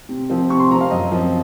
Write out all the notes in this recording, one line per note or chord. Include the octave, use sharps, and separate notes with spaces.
C3
F3 C4
C3 C#6
C6
F3 C4 A#5
F5
F#2 D#5
F3 C4